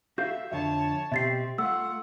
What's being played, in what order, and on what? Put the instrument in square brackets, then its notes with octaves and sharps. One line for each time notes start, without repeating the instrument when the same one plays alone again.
[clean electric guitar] F#4 A4 F5 [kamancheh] E5 [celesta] G6
[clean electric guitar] F2 D3 [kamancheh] C#5 A5 [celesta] E5
[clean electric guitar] B2 G4 [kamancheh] C4 [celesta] E5 A6 C7
[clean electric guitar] A3 [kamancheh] F4 F#5 [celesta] E6